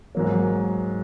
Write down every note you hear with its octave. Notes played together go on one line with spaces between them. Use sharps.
G#2 F#3 A#3 C#5